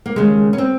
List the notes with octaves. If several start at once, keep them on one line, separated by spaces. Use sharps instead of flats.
A#3
D#2 C#3 G#3
C#4
C4